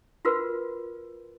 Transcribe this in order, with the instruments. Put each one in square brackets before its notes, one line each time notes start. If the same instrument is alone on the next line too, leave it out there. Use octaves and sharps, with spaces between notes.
[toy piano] F4 F#4 A#4 B4